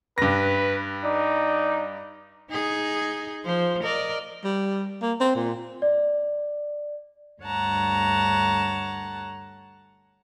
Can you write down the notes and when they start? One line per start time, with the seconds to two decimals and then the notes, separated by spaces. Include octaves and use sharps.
0.18 G2 B4 A#6
1.04 D#4 D5
2.51 D#4 G#4
3.45 F3 C5
3.83 A#4 D5 D#5
4.44 G3
5.02 A#3
5.20 C4
5.35 A#2
5.82 D5
7.42 D2 G2 C#5 F#5 A5 A#5